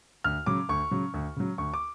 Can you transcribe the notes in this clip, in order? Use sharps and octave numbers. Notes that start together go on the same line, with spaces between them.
D2 F6
C#3 F#3 D6
D2 C#6
C#3 F#3
D2
C#3 F#3
D2 C#6
D6